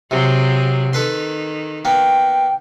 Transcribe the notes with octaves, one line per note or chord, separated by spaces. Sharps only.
C3 F#3 C4 G#4
D#3 A4 B4 C6
A#3 B3 G5